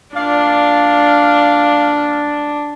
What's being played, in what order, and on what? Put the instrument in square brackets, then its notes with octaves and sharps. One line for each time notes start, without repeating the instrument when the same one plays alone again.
[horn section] A#2 D5 F5 [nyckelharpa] D4